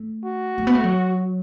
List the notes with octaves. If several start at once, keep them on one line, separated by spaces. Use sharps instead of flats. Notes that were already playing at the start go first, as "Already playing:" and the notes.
Already playing: A3
F#4
A3
B3
A3
F#3